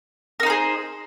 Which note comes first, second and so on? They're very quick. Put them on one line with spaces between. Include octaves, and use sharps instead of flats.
A#4 D#4 C5 G#4